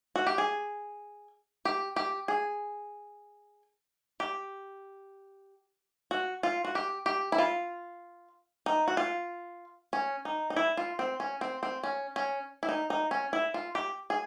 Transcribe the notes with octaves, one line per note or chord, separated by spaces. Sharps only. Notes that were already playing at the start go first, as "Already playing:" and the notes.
F#4
G4
G#4
G4
G4
G#4
G4
F#4
F4
F#4
G4
G4
E4
F4
D#4
F#4
F4
C#4
D#4
D#4
E4
F4
C4
C#4
C4
C4
C#4
C#4
E4
D#4
D#4
C#4
E4
F4
G4
G#4